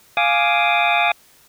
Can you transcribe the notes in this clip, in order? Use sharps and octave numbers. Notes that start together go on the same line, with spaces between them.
F5 G#5 D6 D#6